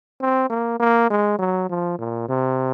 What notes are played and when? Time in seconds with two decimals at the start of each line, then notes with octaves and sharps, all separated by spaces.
0.21 C4
0.50 A#3
0.79 A#3
1.10 G#3
1.39 F#3
1.69 F3
1.99 A#2
2.29 C3